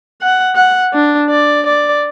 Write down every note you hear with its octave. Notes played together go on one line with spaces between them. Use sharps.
F#5
F#5
D4
D5
D5